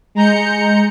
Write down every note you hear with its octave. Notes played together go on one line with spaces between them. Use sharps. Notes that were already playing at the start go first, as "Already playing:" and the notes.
G#3 A#5 G6 C#7